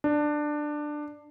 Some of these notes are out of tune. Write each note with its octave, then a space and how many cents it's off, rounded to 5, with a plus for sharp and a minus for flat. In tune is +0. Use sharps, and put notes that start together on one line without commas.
D4 +15